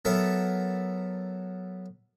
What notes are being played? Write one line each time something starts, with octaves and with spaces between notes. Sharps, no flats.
F#3 B3 A4 A#4 E5